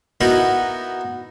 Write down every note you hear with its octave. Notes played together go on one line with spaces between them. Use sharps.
B3 D#4 E4 F#4 A#4 B4